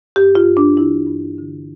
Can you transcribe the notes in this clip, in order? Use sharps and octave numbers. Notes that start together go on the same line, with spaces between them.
G2 G4
F4
G2
D4
E3 E4
G2
D3